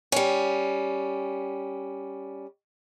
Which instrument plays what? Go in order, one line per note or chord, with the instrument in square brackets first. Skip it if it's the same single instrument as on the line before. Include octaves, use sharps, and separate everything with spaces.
[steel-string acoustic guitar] G3 C#4